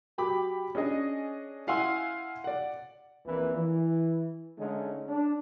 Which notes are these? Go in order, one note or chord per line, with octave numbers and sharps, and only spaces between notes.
F#3 G4 B5 D6
C#4 D4 G#4 D#5
E4 F5 F#5 G#5 C6 E6
D5 F#5
A#1 F2 A#2 E3
E3
D3 G#3 A3 C#4 D#4
D4